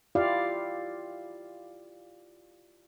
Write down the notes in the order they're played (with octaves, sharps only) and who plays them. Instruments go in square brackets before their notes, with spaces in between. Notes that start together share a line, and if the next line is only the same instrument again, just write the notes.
[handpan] E4 F4 G4 D5 F5